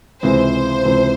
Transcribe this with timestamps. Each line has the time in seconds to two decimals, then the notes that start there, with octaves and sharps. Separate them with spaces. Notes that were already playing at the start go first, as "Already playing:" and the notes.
0.22 C#2 C3 E3 G#3 C4 C5
0.84 C#2 C3 E3 G#3 C4